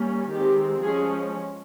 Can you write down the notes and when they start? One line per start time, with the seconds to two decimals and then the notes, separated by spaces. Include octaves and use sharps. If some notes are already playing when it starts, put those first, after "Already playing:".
Already playing: G3 A#3 C#4
0.30 D#3 G#3 C4 G4
0.82 F3 G#3 C#4 G#4